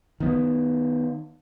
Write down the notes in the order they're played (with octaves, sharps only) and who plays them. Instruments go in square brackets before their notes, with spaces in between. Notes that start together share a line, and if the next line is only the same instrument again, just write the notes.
[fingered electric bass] D#3 B3